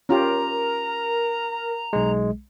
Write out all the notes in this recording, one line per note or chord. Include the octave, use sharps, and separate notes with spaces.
C#4 F4 G4 A#4 A#5
B1 G#3